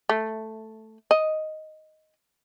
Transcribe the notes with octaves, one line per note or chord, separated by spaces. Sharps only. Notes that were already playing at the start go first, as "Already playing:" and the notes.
A3
D#5